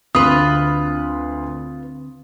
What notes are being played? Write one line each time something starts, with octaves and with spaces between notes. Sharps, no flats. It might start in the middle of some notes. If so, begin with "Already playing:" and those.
D2 D3 C4 F4 B4 C6 D#6